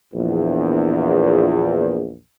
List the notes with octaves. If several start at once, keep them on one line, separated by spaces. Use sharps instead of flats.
A#1 E2